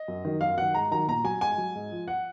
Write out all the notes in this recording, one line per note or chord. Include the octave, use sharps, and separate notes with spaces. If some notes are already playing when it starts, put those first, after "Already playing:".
Already playing: D#5
F#2
D#3 F#3
F#2 F5
D#3 F#3 F#5
G#2 A#5
D#3 F#3 A#5
A#2 A#5
F#3 G#5
G#2 G#5
F#3
G#2
F3
F#5